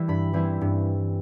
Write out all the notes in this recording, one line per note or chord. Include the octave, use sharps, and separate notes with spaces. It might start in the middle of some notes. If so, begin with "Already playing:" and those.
Already playing: E3 G3 E4
G2 B5
E3 G3 C4 E4
G2